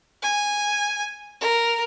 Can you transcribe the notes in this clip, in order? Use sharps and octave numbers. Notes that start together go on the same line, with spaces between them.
G#5
A#4